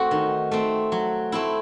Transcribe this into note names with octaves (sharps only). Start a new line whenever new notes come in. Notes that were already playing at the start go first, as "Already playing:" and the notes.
Already playing: A3 C4 F#4
D#3
A3 C4
F#3
A3 C4 E4